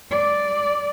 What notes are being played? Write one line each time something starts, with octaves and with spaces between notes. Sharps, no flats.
D5